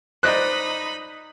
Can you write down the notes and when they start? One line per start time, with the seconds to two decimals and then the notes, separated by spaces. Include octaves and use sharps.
0.23 D#4 C5 D5 D#5 B5 F#6